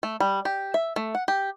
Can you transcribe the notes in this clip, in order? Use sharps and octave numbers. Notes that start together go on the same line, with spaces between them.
A3
G3
G4
E5
A3
F#5
G4